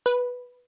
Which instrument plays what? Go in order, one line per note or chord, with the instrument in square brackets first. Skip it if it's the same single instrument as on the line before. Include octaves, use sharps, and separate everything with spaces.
[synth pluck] B4